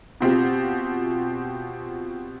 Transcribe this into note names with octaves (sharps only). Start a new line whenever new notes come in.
B2 C4 F4 G4